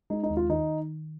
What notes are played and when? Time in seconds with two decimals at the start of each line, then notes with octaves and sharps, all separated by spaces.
0.10 G#3 D#4
0.23 D#4
0.30 D#2
0.37 F4
0.50 D#3 D#4